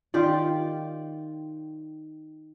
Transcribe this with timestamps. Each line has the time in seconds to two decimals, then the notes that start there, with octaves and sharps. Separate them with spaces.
0.14 D#3 F4 G4 D5